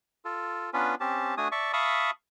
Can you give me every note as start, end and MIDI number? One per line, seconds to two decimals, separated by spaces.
0.25 0.70 65
0.25 0.70 69
0.73 0.95 59
0.73 0.95 61
0.73 0.95 62
0.73 0.95 65
0.73 0.95 71
1.00 1.35 60
1.00 1.35 61
1.00 1.35 67
1.00 1.35 81
1.38 1.48 57
1.38 1.48 62
1.38 1.48 66
1.38 1.48 80
1.38 1.48 87
1.52 1.72 74
1.52 1.72 76
1.52 1.72 81
1.52 1.72 85
1.73 2.11 76
1.73 2.11 77
1.73 2.11 81
1.73 2.11 83
1.73 2.11 85
1.73 2.11 87